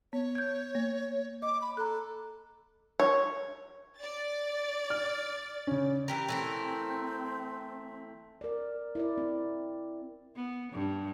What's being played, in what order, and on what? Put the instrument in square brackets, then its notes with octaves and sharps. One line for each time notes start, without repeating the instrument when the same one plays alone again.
[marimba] B3 [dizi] C#5
[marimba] G6 G#6
A#3
[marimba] D#5 [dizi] D6
[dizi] B5
[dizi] A4 [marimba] A#5 F#6
[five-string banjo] C#5
[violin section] D5 A6
[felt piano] F6
C#3 C#4
[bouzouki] E3 G4 A#4
[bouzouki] E3 A3 A#4 [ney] C4
[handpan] A#4 D5
E4 A#4 D5
C4
[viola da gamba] B3
G2